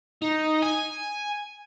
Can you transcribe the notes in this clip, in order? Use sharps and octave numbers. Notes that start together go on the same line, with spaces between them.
D#4
G#5